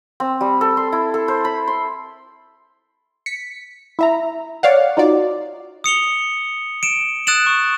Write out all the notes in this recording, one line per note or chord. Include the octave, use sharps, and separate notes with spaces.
C4
G3
A4
C6
E4
A4
C5
B5
C6
B6 C#7
E4 E5 A#5
C#5 D5 F5 F#5
D#4 F4 F#4 D5
D#6 C#7 F7 G7
D7 E7
D#6 F#6 A6 D7 E7 F#7
C#6 D#6